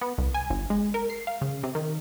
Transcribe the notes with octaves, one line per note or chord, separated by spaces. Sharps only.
B3
C2
G#5
G1
G#3
A#4
C7
F5
C#3
C3
D#3